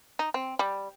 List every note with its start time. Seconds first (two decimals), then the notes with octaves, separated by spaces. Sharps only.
0.19 D#4
0.34 C4
0.59 G3